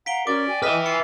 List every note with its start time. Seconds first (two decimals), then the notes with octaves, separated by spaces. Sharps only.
0.06 F5 F#5 A#5 B6 D7 G7
0.27 C#4 F#4 A#4 D5 D6
0.47 G5 G#5
0.62 B4 D#5 E5 F6 B6
0.86 F4 C#7